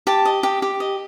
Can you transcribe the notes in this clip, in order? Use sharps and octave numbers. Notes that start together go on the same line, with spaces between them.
G4 A5
D#5
G4
G4
D#5